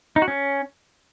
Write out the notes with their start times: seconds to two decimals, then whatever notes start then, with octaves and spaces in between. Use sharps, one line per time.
0.16 D#4
0.22 F#4
0.28 C#4